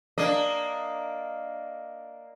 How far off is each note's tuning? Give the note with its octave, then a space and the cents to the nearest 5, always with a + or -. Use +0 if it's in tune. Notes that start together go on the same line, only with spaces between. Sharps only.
A#3 +0 D4 +0 D#5 +0